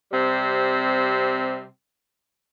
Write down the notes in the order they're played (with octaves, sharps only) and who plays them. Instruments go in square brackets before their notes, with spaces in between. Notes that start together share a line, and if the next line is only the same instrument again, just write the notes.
[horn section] C3 G3 C4